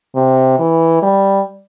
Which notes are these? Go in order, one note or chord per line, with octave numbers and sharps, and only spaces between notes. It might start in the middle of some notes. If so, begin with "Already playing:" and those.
C3
E3
G3